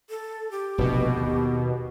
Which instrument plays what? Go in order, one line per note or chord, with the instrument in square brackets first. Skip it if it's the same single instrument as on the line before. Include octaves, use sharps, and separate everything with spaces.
[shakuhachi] A4
G4
[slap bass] F1 A#1 G2 [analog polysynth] B2
[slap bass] D#2